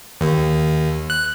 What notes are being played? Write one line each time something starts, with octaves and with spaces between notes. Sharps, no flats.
D#2
F#6